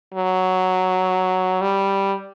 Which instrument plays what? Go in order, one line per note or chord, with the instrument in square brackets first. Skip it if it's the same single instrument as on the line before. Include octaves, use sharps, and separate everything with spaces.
[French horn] F#3
G3